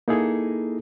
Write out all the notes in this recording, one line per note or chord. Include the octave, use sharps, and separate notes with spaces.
A#3 D#4 E4 G#4 A4